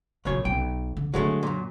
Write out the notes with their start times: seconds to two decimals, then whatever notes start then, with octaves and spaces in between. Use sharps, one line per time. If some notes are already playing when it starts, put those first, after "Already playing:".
0.25 B1 F#2 A#2 C#3 C#5
0.45 B1 G5
0.97 D3
1.14 D3 F#3 G#3 A3 D4
1.43 F#2 A#2